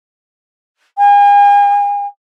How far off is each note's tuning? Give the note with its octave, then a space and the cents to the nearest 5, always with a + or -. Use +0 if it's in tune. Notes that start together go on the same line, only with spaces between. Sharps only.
G#5 -40